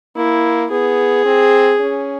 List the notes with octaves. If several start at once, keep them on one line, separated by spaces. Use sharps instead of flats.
A#3 E4
B3 G#4
C4
C#4